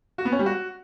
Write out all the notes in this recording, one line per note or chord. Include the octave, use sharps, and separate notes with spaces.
F#4
B3
C#4
G3
F#4